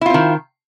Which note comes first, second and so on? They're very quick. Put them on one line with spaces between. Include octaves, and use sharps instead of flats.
E4 F4 C4 D#3